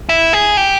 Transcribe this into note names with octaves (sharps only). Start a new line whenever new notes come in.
E4
G#4
G4